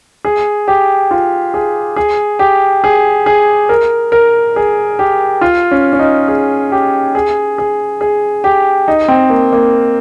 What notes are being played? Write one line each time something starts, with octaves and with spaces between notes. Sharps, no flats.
G#4
G4
F4
G#4
G#4
G4
G#4
G#4
A#4
A#4
G#4
G4
F4
C#4
C#4
D#4
G#4
G4
G#4
G#4
G#4
G4
D#4
C4
A#3
A#3